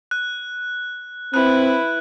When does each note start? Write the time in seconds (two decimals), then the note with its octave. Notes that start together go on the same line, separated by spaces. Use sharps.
0.11 F#6
1.34 C4 E4 B4 F#6